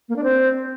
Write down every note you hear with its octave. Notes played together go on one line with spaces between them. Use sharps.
A#3
D4
C4